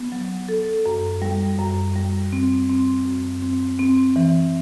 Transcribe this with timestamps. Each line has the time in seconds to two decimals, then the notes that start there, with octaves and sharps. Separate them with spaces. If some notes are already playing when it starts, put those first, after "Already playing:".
Already playing: B3
0.12 F#3
0.49 A4
0.86 F#2
1.22 G3
1.59 F#2
1.95 G3
2.32 C4
2.69 C4
3.06 F#2
3.42 C4
3.79 C4
4.16 E3